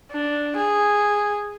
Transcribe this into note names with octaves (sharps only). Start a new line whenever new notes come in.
D4
G#4